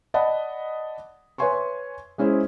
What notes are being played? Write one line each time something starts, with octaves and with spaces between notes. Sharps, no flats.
D5 D#5 F#5 A5 B5
B4 C#5 E5 G#5 C6 C#6
G#3 C#4 E4 G#4 C5